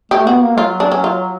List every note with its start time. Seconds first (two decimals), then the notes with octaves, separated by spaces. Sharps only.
0.11 A3 G4
0.26 B3 F#4
0.42 A#3
0.58 F#3 F4
0.80 D4
0.92 C#4
1.04 F4